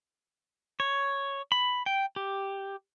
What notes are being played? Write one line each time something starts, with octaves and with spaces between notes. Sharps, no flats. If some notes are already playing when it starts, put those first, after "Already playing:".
C#5
B5
G5
G4